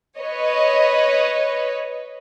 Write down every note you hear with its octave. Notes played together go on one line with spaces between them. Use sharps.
B4 C#5 D#5